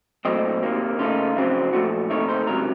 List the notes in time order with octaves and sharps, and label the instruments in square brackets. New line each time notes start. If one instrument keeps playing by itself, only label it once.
[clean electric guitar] A#2 F#3 A3 C4 D#5
C3 D#3 A#3
C#3 A3 D#4 F4
F2 C#3 F#3 C4
A#2 F3 A3 F#4
C3 D#3 A3 D#4 C#5
C5
C#2 C3 F#3 A#4